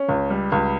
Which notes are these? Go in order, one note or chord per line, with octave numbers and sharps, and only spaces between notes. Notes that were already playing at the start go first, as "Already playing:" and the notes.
Already playing: C#4
C#2
G3
C#2